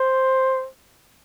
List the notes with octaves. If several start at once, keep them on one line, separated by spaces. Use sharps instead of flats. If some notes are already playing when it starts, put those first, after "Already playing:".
Already playing: C5